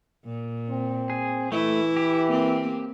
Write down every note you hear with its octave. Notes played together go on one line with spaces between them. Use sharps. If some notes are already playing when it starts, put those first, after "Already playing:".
A#2
C4
G#4
E3 A3 E4
G4
A#3 C4